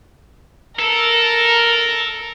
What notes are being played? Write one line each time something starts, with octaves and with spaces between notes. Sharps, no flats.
A4 A#4